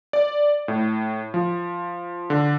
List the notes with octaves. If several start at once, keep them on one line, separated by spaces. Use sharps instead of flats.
D5
A2
F3
D3